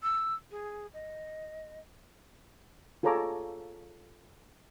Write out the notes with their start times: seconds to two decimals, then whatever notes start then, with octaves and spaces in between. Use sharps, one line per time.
0.03 E6
0.51 G#4
0.94 D#5
3.03 F4 G#4 A4 C#5 A#5 D6